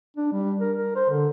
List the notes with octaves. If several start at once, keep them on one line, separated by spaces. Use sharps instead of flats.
D4
G3
A#4
A#4
C5
D3